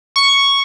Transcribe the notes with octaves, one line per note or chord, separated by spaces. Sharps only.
C#6